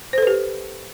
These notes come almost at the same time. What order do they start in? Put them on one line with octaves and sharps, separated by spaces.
C5 A4 B4 G4